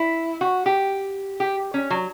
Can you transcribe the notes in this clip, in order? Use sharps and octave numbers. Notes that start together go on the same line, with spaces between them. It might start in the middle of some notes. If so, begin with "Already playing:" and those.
Already playing: E4
F#4
G4
G4
C#4
F#3